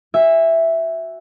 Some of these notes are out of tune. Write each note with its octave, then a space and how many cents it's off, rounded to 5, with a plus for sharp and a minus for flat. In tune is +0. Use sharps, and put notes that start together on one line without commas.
F#4 +0 E5 +0 G#5 -30